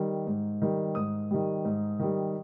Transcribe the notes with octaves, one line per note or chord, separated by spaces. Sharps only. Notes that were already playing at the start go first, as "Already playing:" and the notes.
Already playing: D#3 G3
G#2
D#3 G3
G#2 D#6
D#3 G3
G#2
D#3 G3